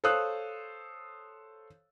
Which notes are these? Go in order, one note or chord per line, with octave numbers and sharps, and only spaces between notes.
A4 C5 C#5 F5 D#6 F#6